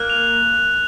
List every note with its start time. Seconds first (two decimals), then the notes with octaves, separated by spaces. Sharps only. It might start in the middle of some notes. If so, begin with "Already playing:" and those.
Already playing: A#3 F#6
0.10 F7